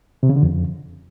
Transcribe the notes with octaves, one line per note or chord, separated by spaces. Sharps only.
C3
C#3
D3
F2